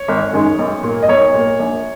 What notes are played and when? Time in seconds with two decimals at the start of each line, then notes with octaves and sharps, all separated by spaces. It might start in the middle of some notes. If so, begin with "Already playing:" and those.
Already playing: C#5
0.08 G#1
0.33 F#2 D#3 G#3
0.59 B1
0.83 A#2 A#3
1.03 D#5
1.08 B1 C#5
1.34 A#2 A#3
1.60 A#1